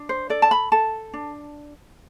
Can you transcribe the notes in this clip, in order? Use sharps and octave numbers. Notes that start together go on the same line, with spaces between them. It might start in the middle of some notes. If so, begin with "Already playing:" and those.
Already playing: D4
C5
A4 D5
A5
B5
A4 A5
D4